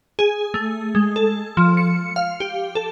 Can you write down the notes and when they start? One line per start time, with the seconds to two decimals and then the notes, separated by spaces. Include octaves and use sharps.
0.19 G#4
0.54 A3
0.95 G#3
1.16 A4
1.57 F3
1.77 C#7
2.16 F5
2.40 G4
2.75 A4